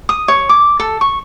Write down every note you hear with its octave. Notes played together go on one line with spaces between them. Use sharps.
D#6
C#5
D6
A4
C#6